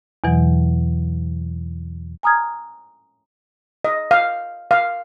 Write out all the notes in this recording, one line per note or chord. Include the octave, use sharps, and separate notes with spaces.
E2 B2 E3 F#3
G#5 A#5 D#6 F6 G#6
D#5
F5
F5